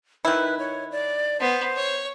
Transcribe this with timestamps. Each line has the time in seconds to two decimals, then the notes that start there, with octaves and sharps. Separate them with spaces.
0.25 D#3 E4 B4
0.59 C#5
0.92 D5
1.40 B3 C5
1.76 C#5